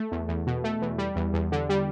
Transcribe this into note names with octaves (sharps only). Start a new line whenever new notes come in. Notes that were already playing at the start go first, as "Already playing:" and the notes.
Already playing: A3
E2
E2
B2
A3
E2
G3
E2
E2
D3
G3